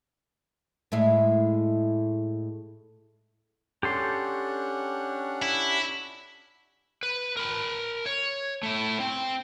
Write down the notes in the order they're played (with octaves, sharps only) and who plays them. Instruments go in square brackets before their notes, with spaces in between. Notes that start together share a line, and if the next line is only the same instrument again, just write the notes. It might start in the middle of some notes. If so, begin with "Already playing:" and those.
[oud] A2 G#3 E4
[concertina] C#4 D4 F#5 [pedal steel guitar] G4 A4 C6
[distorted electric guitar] E4
[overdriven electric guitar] B4
A#4 B5
C#5
A3 E4
C4